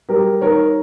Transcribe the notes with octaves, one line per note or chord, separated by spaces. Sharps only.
G3 G4 A#4
D#3 A#4 C#5